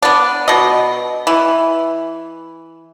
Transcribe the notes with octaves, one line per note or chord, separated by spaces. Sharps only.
B3 D4
B2 D#5
E3